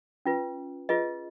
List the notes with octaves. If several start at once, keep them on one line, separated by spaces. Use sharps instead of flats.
C#4 F4 B4
F4 G#4 B4 D#5